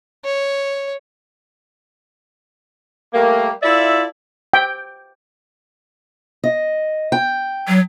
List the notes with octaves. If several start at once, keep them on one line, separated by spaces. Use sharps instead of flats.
C#5
G3 A3 A#3
E4 F4 A4 D5 E5
G5
D#5
G5
F#3